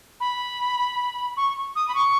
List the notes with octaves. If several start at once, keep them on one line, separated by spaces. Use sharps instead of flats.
B5
C#6
D#6
B5
C#6